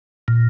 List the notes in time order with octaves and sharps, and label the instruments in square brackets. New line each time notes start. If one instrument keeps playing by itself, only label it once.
[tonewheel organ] A#2